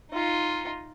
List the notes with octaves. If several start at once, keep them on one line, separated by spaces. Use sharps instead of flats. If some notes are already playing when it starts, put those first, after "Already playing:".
D#4 F4